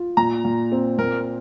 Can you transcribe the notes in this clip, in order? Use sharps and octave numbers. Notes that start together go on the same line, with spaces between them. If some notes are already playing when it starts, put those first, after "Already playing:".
Already playing: F4
A#2 A#5
A#2
C4
A#2 A#4